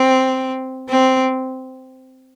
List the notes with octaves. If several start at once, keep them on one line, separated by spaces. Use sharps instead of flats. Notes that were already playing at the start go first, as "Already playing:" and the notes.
Already playing: C4
C4